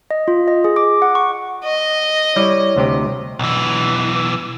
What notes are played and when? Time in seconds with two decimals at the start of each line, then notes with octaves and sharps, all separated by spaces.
0.11 D#5
0.28 F4
0.48 D#5
0.64 G#4
0.76 D6
1.02 F#5
1.15 C#6
1.64 D#5
2.36 G3 E4 C#5 D5
2.76 D2 C3 G4
3.39 B1 E3